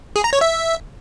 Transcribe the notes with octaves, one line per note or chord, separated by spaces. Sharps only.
G#4
A#5
C#5
E5